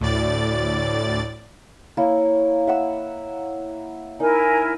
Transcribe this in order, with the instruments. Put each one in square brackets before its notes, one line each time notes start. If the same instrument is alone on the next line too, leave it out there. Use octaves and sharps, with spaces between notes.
[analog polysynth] D2 A2 D5 A6
[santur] A#3 E4 C#5
E5 F#5 E6
[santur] D#4 [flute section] E4 A#4 G#5